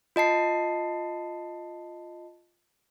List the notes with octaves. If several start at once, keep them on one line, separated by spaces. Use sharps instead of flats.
F4 D#5 A5 C7